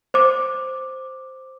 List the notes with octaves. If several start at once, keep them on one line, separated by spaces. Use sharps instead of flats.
C5 D6